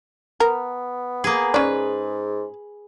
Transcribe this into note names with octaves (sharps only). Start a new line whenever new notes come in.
B3 A#4
A#3 G#4
G#2 C#4 B4 D5